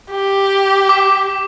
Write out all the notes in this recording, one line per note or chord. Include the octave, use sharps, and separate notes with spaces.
G4
D6